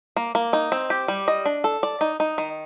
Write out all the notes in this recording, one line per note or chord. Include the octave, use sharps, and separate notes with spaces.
A#3
A#3
D#4
C4
G4
G3
D#5
D4
A4
D5
D#4
D#4
D#3